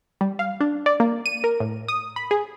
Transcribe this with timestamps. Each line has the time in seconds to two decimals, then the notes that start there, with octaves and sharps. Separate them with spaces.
0.21 G3
0.39 F5
0.60 D4
0.86 D5
1.00 A#3
1.26 D#7
1.44 A#4
1.60 A2
1.88 D#6
2.16 B5
2.31 G#4